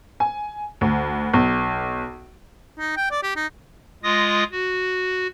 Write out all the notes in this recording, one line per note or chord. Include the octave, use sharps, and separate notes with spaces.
G#5
D2
B1
D#4
G5
D5
G4
D#4
G#3 F4 D#6 A#6
F#4